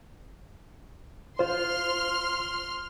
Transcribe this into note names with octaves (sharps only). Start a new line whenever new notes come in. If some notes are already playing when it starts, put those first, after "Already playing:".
F4 C5 C6 F6